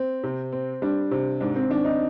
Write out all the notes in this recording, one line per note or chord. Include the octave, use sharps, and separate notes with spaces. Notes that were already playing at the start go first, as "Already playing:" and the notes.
Already playing: C4
C3
C4
G3 D4
C3
G#2 D4
C4
D#3 D4
D#4